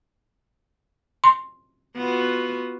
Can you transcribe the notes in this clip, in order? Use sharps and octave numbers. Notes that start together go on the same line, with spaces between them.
C6
B3 F4 F#4